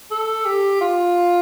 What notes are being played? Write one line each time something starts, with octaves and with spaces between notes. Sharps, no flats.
A4
G4
F4